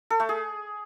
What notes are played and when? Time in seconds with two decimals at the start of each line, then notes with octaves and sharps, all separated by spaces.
0.10 A4
0.20 A3
0.29 G#4